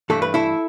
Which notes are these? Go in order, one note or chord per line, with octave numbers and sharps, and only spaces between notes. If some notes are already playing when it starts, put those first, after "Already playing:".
G2 E3 A3 A4
B4
E4 A4